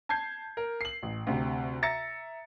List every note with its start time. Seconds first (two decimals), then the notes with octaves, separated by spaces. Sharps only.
0.09 A5 G6 G#6 C7
0.57 A#4
0.81 C7 F#7
1.03 A1
1.27 D2 C3
1.82 E5 A#5 A6 A#6 C#7